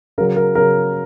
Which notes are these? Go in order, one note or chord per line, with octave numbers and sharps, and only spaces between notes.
C#3 F#3 A#4
A#4
C#3 F#3 A#4